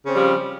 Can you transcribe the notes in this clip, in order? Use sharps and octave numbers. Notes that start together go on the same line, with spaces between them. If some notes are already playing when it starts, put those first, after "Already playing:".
C#3 F3 G3 C4 C#4